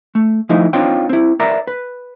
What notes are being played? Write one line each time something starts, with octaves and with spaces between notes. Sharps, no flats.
A3
F3 A3 D#4 E4
C4 D4 D#4 F4 C#5 G5
C4 E4
A#4 B4 D5 E5 A#5
B4